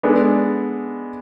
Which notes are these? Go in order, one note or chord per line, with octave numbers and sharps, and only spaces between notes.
G#3 B3 D4 A4